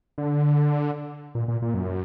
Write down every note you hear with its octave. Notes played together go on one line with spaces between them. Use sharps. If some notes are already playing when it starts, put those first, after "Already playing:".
D3
A#2
A#2
A#2
F#2